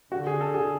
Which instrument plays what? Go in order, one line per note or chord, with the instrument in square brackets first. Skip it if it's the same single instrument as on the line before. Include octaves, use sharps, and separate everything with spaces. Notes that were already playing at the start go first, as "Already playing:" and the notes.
[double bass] D3 [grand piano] F#4
[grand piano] G#4
A4
G#4